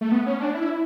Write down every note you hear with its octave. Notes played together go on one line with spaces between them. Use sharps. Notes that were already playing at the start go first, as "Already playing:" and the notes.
A3
B3
C#4
D4
E4